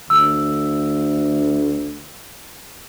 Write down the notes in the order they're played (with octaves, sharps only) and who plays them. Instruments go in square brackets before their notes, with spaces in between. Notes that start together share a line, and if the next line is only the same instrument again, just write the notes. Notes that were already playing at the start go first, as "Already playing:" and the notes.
[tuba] D2 [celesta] E6